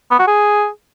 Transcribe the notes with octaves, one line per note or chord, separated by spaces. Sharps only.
B3
F#4
G#4